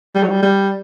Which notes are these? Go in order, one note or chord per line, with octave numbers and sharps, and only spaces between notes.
G3
F#3
G3
G3